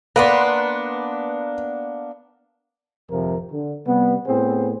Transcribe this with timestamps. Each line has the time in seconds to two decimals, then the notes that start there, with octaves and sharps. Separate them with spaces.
0.16 A#3 B3 D4 B4 C6
3.10 G#1 F2 C3 F3 A#4
3.51 D3
3.86 C3 G3 B3
4.27 A2 B3 C4 G#4 C5